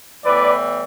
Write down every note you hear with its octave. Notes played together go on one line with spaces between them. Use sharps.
A2 E3 G3 B3 B4 D5